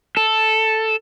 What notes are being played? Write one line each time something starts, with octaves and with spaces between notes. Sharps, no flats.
A4